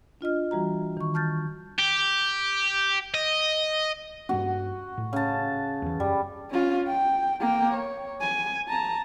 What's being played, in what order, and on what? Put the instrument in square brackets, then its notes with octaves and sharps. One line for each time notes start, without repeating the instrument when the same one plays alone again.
[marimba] D4 F4 D#5 F6
E3 G3 F#4 A#5
D#3 C#6
A5 F6 G6 A6
[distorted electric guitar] G4
D#5
[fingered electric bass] G2 A#3 C#4 [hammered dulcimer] F#4
[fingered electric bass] A2
[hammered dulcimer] C#3 A5
[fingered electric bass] E2 E3
[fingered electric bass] F#2 [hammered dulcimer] G3
[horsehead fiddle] C#4 F4
G5
A#3 G5
C#5
G#5
A5 A#5